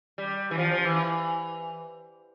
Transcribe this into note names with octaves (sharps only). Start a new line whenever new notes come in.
G3
E3
F3
F3
E3